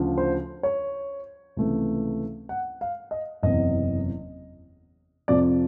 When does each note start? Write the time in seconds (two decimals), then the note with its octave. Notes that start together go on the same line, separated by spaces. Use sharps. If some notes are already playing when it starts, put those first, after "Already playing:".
Already playing: D2 C#3 F3
0.18 C5
0.63 C#5
1.57 C#2 C3 E3 A3
2.49 F#5
2.81 F5
3.11 D#5
3.43 F#1 E2 C3 D#5
5.28 F2 C3 F3 D5